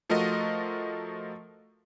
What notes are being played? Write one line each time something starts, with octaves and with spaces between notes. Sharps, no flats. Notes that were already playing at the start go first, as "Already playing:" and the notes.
F3 A3 F4 F#4 A#4 D#5